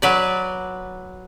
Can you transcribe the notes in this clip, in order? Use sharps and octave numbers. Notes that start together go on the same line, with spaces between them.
F#3 B4 D5